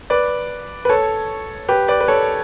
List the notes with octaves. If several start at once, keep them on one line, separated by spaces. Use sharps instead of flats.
B4 D5
B4
A4 C#5
G4 B4
B4 D5
B4
A4 C#5